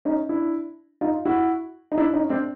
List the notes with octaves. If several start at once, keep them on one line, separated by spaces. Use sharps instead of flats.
C#4 D#4
D4 E4
D#4 F4
E4 F#4
D#4
D4 E4
C#4 D#4
C4 D4